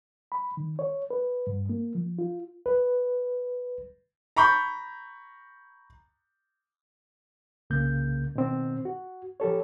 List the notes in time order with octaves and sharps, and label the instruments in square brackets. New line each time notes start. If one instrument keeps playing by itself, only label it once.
[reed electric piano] B5
D#3
C#5
B4
G2
A#3
F3
F4
B4
[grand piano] A#5 B5 C#6 G6
[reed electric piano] C2 C#3 A#3 G6
B2 D#3 C4
F#4
F3 G4 A4 C#5